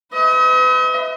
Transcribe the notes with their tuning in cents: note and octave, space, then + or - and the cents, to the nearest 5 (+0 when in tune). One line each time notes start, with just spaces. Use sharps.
B4 +40 D#5 +45